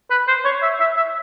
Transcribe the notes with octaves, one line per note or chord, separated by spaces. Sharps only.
B4
C5
C#5
E5
E5
E5